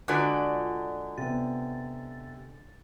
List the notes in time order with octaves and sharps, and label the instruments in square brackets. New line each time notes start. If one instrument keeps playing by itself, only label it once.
[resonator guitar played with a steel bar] D3 G#3 F#4 [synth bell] F4 D5 A#5
[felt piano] C3 B3 [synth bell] A6